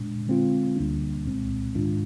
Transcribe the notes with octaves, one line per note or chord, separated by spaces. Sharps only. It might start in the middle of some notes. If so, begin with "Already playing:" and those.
Already playing: A#2 G#3 D4
D3 G#3 C4 F4
D2 D3 G3 A#3 D4
C2 A#2 G#3 C4
G#2 D#3 G#3 D4 F4